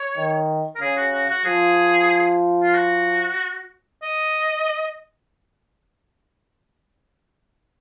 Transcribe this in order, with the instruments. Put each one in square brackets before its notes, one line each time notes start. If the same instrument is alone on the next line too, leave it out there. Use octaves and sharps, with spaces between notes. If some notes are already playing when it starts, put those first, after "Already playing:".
Already playing: [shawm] C#5
[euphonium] D#3
[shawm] A#4
[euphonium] C#3 [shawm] G#4
[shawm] F#4
F#4
F#4
[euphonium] F3 [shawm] G#4
[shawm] F4
F#4
D#5